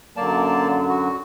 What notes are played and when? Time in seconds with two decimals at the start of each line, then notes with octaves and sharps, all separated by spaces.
0.17 F#2 D3 F#3 A#3 D5 A5
0.88 F#4